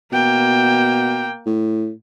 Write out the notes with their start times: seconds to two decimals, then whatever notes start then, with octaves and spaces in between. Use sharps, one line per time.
0.12 B2 A#3 G5
1.46 A2